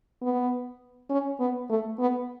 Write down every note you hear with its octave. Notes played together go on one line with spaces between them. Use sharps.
B3
C#4
B3
A3
B3